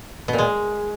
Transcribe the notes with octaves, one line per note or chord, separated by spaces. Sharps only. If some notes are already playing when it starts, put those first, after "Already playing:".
B2
A#2
G#3